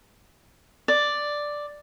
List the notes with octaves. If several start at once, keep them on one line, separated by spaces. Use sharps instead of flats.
D5